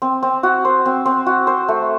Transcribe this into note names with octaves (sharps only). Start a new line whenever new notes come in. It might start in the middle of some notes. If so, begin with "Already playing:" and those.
C4
C4
F#4
C5
C4
C4
F#4
C5
A3